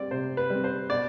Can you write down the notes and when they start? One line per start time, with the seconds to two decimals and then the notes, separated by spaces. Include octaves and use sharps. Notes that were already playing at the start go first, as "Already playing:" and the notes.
Already playing: G3 C4 D5
0.11 C3 C5
0.37 B4
0.50 G3 C4
0.64 C5
0.90 B2 D5